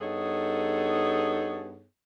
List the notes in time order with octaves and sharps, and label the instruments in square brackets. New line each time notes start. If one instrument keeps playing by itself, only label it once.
[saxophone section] G2 B3 D#4 G#4 A4 C#5